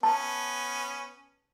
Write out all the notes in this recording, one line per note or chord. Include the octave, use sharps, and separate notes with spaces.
B3 C#4 A5